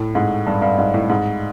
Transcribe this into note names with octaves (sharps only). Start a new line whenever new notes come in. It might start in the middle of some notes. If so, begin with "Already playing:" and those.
Already playing: A2
G#2
G2
G2
G#2
A2
G#2